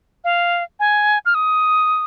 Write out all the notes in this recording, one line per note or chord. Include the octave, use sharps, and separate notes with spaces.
F5
G#5
F6
D#6